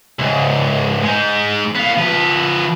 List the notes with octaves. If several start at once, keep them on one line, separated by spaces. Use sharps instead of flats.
C#2 G#2
G#3 D#4
B3 F5
F3 B4